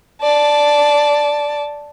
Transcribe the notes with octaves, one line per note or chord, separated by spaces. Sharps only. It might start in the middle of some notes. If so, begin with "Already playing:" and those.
D5 A5